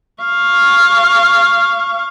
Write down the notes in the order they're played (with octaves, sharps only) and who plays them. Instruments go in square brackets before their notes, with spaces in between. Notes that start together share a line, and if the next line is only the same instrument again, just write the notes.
[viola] F5 C#6